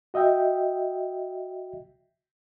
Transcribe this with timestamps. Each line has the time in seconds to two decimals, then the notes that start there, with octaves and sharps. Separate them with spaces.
0.14 F#4 D#5 E5 G5